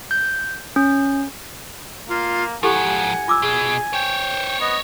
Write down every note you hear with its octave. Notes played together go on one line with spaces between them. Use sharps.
G6
C#4
A#3 F4
G#2 F3 E4 G4 A4 F#5 G#5
F4 D6 E6
B2 G#4
C5 C#5 G5
B3 D#5